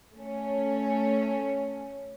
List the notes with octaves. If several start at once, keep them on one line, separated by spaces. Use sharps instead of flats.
A3 C#4